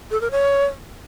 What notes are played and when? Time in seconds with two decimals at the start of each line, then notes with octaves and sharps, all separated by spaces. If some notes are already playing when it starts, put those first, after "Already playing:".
0.11 A4
0.21 A#4
0.31 C#5